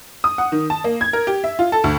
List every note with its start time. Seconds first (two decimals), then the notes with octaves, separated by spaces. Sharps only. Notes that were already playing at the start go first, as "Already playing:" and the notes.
0.24 D#6
0.38 F#5
0.52 D#3
0.70 A5
0.84 A#3
1.01 G#6
1.13 A#4
1.27 G4
1.44 E5
1.59 F4
1.72 A4
1.84 D2